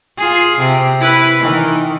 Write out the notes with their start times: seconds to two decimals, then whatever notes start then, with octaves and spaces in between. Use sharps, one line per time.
0.18 F4 G#4
0.59 C3
1.00 E4 B4
1.39 D#3 E3